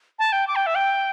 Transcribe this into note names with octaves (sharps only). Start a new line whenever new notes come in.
A5
G5
D6
G5
E5
G5